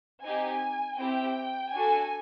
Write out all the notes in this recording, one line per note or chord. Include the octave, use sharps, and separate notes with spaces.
C4 D#4 G4 G#5
C4 E4 G4 G5
D4 F#4 A4 G#5